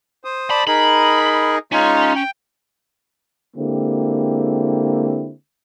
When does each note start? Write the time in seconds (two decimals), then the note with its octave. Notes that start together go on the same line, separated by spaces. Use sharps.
0.24 C5 D#6
0.50 D5 A5 B5
0.67 D#4 G#4 A#4 B5
1.72 G#3 C#4 D#4 F4
2.16 G5
3.56 D3 G#3 A#3 C4 E4 G4